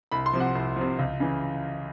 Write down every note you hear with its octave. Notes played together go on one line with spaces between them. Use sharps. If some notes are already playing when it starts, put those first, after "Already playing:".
C2 B5
C6
C3 F3
F#5
C2
C3 F3
C#2
C#3 E3